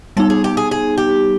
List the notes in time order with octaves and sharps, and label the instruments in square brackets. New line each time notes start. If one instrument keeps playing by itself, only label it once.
[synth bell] G3 B3 D#4 [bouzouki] A4
[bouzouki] G#4
G4
G#4
G#4
G4